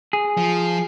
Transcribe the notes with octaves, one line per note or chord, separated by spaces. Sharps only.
G#4
F3